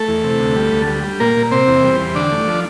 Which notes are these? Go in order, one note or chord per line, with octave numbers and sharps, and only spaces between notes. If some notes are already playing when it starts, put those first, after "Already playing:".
Already playing: A3 A4
E2
C3
D2
G3
D2
G3
G3
A#2 A#3 A#4
A#2
C3 C4 C5
E2
G3
E2
D3 D4 D5
A3
F3